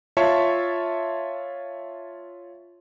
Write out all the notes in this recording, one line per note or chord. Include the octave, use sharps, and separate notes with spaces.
F4 C#5 E5 A5 C#6